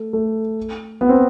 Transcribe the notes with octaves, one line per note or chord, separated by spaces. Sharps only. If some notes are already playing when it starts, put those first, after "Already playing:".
Already playing: A3
A3
B3
C4